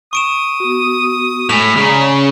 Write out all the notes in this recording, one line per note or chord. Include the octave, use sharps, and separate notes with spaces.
C#6 D#6 D7 E7
B3 F#4
A2 G#3 G#5 B5 F7
C#3 D5 A#5
C#5